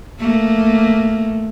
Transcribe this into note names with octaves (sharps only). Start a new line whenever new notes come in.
A3 A#3